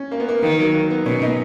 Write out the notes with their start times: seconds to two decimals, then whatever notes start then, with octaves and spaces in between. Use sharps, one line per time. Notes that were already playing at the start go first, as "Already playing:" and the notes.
Already playing: C#4
0.12 A#3
0.20 B3
0.29 A#3
0.43 D#3 A#3
0.59 F#3
0.74 A#3
0.90 B3
1.05 B2 C#4
1.22 D#4